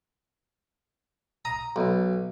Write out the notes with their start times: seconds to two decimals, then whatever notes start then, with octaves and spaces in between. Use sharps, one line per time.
1.45 A#5 D#6
1.76 B1